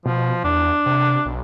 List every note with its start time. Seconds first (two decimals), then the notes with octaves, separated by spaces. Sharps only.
0.06 B2 F3
0.44 E2 D4
0.86 C3
1.26 B1